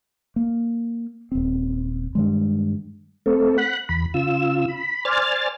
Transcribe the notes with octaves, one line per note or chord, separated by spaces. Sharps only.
A#3
D#1 C4
G2 D#3 G#3
A3 C4 A4
F#5 B5 F#6
E2 B5
C#3 F4 E6
B5
C5 D5 G#5 F6 A6